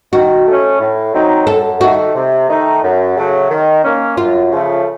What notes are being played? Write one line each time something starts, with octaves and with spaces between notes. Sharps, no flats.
D#3 F#4
A3 C#4
A2
F#3 C4 D#4
F#2 A4
D#3 A3 F#4
C3
D#3 A3 D#4
F#2
C#3 F#3 A3
D#3
A#3 C#4
F#2 F4
C#3 F3 A3